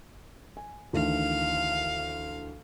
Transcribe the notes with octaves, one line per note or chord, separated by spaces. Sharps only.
G#5
D2 D#3 E3 F5